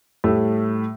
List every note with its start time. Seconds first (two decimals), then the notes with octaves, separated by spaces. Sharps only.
0.24 A2 G3 A3